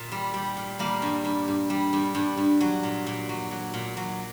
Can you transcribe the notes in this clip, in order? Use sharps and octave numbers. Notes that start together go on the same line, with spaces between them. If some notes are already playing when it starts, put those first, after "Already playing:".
Already playing: A#2
G3
G3
A#2
G3 A#3
G2
G2
G2
G3
G2
G2
G2
F#3
A#2
A#2
F#3
F#3
A#2
F#3